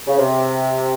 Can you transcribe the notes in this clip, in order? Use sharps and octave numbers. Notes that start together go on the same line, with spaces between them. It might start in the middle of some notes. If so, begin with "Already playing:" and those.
C#3
C3